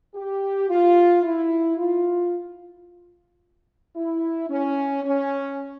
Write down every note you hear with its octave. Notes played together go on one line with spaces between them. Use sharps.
G4
F4
E4
F4
E4
C#4
C#4